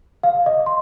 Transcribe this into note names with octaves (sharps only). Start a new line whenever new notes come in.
F5
D#5
C6